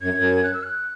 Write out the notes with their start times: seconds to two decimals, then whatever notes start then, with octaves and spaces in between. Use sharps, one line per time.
0.01 F#2 G#6
0.17 F#2
0.43 F#6
0.53 E6
0.63 F#6